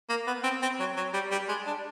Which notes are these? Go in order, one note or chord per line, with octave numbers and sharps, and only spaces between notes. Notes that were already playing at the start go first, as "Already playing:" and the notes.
A#3
B3
C4
C4
F#3
F#3
G3
G3
G#3
D4